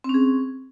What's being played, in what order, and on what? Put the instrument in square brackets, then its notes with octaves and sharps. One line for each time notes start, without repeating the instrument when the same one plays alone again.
[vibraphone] C4
C#4
G#4